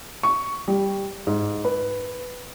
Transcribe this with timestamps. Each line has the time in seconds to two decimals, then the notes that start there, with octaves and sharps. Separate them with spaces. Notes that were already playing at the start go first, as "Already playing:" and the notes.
0.23 C#6
0.68 G3
1.27 G#2
1.65 B4